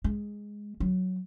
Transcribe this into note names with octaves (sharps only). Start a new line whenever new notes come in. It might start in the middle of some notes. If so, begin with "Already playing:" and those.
G#3
F#3